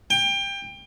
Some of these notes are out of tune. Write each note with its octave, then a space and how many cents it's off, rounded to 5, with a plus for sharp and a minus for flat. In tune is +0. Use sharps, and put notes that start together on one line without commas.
G5 +25